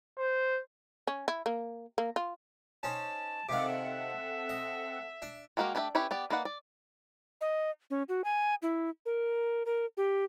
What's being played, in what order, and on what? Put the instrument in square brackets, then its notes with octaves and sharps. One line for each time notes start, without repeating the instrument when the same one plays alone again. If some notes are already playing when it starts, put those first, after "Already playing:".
[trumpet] C5
[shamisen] C#4
E4
A#3
A#3
F4
[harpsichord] C#4 D#4 C5 [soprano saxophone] A5
[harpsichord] C3 D#3 F5 [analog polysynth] C4 A4 F#5 [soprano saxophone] D6
[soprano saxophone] E5
[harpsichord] D#5
D4
[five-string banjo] G#3 A#3 F#4 G4 A#4
A3 D4 G4 C#5 E5
C#4 E4 G4 B4 C#5
B3 G4 D5
A#3 D#4 B4 D5 F#5
D5
[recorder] D#5
C#4
F#4
G#5
E4
A#4
A#4
G4